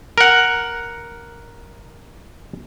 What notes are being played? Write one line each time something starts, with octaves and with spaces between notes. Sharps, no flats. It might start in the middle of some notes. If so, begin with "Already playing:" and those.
A#4 F#5